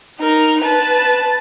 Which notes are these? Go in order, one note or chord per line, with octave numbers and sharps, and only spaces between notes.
D#4 A#4
B4 A5